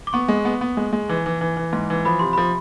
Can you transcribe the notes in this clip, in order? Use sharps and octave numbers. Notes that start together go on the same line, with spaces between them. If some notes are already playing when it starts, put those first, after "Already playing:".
D6
B3 C#6
G#3
B3
B3
G#3
G#3
E3
E3
E3
E3
G#2
E3
F3 B5
C3 C6
F3 B5